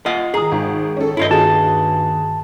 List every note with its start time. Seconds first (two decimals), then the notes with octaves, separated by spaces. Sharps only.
0.06 F4 D#5 F#5
0.34 D#3 G#4 A#5 D#6
0.52 G#1
0.97 C#4 A4
1.17 G2 E4 F4 D#5
1.31 D#2 F#4 G#4 A5